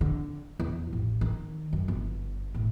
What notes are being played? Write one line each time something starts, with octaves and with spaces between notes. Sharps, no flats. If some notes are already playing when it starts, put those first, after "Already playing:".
D3
E2
A1
D#3
F#2
G1
A2